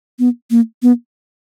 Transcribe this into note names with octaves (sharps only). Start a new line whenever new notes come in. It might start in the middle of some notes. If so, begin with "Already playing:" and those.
B3
A#3
B3